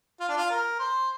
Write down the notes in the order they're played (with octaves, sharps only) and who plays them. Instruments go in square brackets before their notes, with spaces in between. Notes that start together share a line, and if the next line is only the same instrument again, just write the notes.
[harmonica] F4
D4
F4
A#4
C5